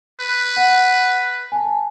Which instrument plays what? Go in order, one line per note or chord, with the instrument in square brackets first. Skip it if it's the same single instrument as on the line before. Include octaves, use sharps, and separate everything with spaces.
[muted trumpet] B4
[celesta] F#5
G#5 A5